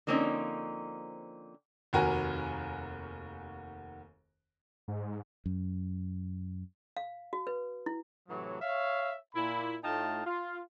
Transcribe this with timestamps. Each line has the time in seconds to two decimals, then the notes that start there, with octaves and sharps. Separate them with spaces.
0.07 D3 F3 A#3 C4 C#4 D#4
1.93 F1 D#2 F#4 A#4 G#5
4.88 G#2
5.46 F#2
6.97 F5
7.33 F#4
7.47 B4
7.86 E4
8.29 A2 C3 E3 F#3
8.61 C#5 E5 F5
9.35 A#2 E4 B5
9.84 A2 A3 D#4 F4 G5 A5
10.26 F4